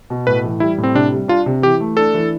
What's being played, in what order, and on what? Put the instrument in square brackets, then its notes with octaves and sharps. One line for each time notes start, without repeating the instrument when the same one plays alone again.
[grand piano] B2
[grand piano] A2 [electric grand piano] B4
[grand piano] E3
[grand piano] G3 [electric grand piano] E4
[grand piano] A2
[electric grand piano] C4
[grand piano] C3 [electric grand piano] D4
[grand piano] G3
[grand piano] D4 [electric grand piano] F4
[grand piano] C3
[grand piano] E3 [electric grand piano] G4
[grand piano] A3
[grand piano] D4 [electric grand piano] A4
[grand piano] E3